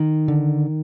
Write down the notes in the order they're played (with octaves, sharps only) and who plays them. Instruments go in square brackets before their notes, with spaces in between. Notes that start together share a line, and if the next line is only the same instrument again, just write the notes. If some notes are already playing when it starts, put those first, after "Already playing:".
Already playing: [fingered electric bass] D#3
D3